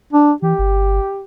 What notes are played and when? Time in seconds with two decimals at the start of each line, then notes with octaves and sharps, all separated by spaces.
0.13 D4
0.42 E3 G4
0.59 G1